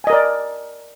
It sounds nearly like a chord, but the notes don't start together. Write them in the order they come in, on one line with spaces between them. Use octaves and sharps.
G#5 D#5 A#4 D5